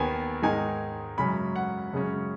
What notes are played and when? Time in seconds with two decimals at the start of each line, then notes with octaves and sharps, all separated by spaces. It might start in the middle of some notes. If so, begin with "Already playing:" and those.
Already playing: D#2 D#3 B3 G#5
0.42 G#2 D#3 G#3 D#4 G#5
1.18 F#2 C#3 G#3 C#4 B5
1.56 F#5
1.93 F#2 C#3 G#3 C#4